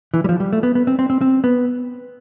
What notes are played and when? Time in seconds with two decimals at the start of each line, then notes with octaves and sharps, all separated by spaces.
0.14 E3
0.24 G3
0.29 F3
0.40 G3
0.53 A3
0.63 B3
0.75 B3
0.87 C4
0.99 C4
1.10 C4
1.21 C4
1.44 B3